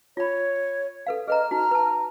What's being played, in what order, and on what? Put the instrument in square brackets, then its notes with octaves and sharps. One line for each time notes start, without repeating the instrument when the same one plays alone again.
[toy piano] F4 B5 [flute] C#5
[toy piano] A4 B4 F5
[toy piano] G#4 B4 A#5 [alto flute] D#5 [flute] F6
[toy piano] D#4 F#4 [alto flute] A#5
[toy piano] B4 A5